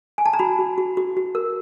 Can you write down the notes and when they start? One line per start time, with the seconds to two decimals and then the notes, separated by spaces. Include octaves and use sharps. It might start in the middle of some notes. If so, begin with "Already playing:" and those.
0.18 G#5
0.26 A5
0.33 A#5
0.39 F#4 B5
0.59 F#4
0.78 F#4
0.97 F#4
1.17 F#4
1.35 A#4